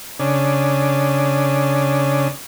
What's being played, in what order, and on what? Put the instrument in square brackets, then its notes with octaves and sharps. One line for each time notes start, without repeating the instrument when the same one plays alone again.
[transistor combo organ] C#3 D4